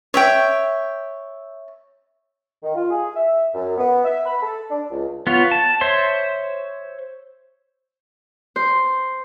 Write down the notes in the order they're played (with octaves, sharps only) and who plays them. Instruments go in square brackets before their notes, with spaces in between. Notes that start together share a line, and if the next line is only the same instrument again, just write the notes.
[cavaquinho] C#5 E5 G5
[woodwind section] D#3
F4
G#4
E5
F#2
B3
E5
B5
A4
D4
C#2
[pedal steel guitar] B3 F4 C#5
A5
C5 C#5 E5 C6
[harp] C5